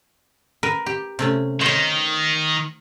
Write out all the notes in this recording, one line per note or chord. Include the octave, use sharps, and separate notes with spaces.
A#4 B4
G4
C3 A3 C#4
D#3 C5 C#5